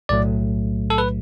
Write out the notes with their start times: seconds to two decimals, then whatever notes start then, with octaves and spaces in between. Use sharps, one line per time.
0.09 B1 A2 F#3 A3 D5
0.90 A4
0.98 B4